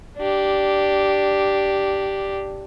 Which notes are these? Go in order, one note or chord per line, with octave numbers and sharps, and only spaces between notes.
D4 G4